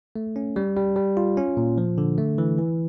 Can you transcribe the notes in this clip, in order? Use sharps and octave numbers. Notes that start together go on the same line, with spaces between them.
A3
C#4
G3
G3
G3
F4
C#4
A#2
F3
D3
A3
E3
E3